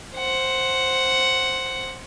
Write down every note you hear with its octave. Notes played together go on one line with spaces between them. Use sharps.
C5 F#5